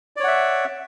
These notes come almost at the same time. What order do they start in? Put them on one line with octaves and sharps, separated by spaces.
D5 C#5 F#5 E5